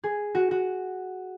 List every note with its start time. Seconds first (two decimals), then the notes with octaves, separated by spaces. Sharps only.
0.04 G#4
0.35 F#4
0.51 F#4